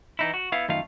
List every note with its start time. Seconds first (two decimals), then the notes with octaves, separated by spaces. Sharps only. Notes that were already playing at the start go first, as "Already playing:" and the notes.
0.19 E3 D#4 E4
0.34 F#4
0.52 B3 E4 F5
0.68 F#2 D#3 A3 F4 F5